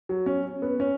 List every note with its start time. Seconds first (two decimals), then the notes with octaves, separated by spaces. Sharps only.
0.09 F#3
0.26 C#4
0.62 B3
0.80 C#4